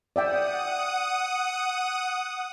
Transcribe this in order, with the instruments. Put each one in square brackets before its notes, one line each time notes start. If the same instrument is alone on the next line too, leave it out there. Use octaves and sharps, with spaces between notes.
[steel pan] D5 E5 G5 [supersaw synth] F#5 D#6